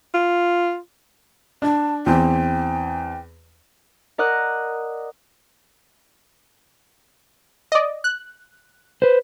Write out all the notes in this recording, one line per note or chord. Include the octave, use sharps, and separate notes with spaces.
F4
D4 A5
E2 C4 G5
A#4 D5 D#5 F#5 F#6
D5 D#5
F#6
B4 C5